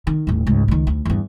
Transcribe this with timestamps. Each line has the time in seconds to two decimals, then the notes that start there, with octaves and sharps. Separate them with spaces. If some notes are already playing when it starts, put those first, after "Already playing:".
0.07 D#3
0.27 D#1 A1
0.47 C#2 G#2
0.68 C#2 D#3
0.87 D2
1.05 E2 G2